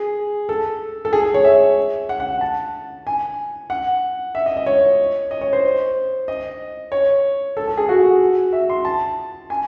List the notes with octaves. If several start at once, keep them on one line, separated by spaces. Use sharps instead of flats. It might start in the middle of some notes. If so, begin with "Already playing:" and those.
Already playing: G#4
A4
A4
G#4
G#4
C#5
E5
F#5
F#5
A5
G#5
F#5
E5
D#5
D#5
C#5
D#5
C#5
C5
D#5
C#5
A4
A4
G#4
F#4
E5
C6
A5
G#5